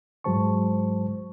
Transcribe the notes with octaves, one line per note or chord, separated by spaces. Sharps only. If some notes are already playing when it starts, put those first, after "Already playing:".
G#2 F#3 G#3 C5 A5 C#6